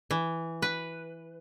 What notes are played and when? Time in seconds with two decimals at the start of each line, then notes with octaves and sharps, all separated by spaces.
0.11 E3
0.62 B4